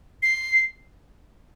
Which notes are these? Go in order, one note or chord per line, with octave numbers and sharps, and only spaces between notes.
C7